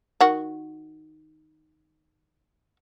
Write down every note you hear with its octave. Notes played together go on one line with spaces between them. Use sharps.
D#3 F#4